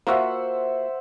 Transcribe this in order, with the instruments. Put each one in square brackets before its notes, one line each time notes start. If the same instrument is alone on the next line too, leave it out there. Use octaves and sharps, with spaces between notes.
[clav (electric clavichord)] A#3 F4 F#4 [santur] C5 E5 F#5